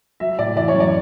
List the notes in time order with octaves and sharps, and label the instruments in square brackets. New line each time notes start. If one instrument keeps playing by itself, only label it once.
[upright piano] F#3 E5
A2 D5
E3 D5
C#5
F#2
D5